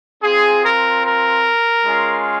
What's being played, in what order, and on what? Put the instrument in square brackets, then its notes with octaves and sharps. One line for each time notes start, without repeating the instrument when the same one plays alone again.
[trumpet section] C4 F4 G#4
A#4
A#4
G#3 C#4 F4